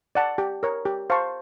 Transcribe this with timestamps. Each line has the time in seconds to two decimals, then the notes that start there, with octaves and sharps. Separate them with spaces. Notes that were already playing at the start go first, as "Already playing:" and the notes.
0.15 D5 F#5 A5
0.38 G4
0.63 A#4 C#5
0.85 G4
1.10 C5 F5 A5 C#6